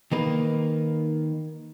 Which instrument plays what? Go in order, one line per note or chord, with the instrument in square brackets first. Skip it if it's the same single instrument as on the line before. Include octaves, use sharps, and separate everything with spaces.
[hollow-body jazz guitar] D#3 A#3 B4